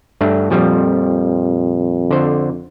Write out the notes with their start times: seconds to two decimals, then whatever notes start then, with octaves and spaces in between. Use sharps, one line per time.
0.21 G2 A3 D4
0.50 F2 A#2 F3 G3
2.11 D3 C5